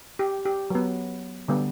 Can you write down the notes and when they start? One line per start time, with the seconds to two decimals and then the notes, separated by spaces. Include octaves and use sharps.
0.19 G4
0.45 G4
0.70 F#3 B3
1.48 D3 G3 B3